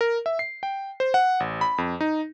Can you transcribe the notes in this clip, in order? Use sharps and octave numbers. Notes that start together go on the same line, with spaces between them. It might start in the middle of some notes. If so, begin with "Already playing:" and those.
A#4
E5
C7
G5
C5
F#5
A1
B5
F2
D#4